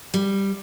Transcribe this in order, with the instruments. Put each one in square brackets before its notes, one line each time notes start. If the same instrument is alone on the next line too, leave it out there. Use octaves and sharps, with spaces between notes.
[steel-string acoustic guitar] G3